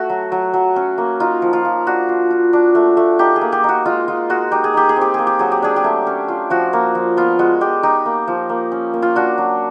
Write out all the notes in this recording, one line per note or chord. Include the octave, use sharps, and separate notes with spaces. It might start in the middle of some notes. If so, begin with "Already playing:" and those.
Already playing: A3 F#4
F#3
F#3
F#3
C#4
A#3
D#4 F4
F3
F4
F3
D4 F#4
F4
F4
D4
A3
A3
D#4 G4
G#4
A#3
G4
D#4 F#4
G#3 F4
G#3 F4
G#3 F#4
D#4 G4
G#4
D#4 G4
G#4
C4
G4
A#3 G#4
G4
F#3 G#4
G4
D4 G#4
G4
A3
C#4
F4
F3 F#4
A#3
F3
B3 F4
G#3 F#4
G#3 G4
D#4 G4
A#3
F3
A#3
C#4
A#3
F4
D4 F#4
F#3